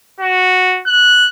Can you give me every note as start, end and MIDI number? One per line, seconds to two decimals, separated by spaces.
0.20 0.80 66
0.86 1.27 90